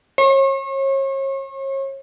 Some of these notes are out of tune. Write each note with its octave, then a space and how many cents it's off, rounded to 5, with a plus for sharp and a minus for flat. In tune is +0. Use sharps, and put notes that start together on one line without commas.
C#5 -40